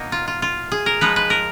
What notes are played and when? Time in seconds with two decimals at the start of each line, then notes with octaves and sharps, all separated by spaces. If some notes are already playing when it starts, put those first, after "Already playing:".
Already playing: B2 A#3 D#4
0.12 F4
0.27 F4
0.42 F4
0.72 G#4
0.86 A#4
1.01 F3 G#3 D#4 B4
1.16 B4
1.30 A#4